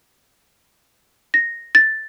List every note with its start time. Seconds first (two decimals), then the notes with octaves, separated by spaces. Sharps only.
1.34 A#6
1.75 A6